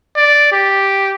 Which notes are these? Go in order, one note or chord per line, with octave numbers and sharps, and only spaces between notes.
D5
G4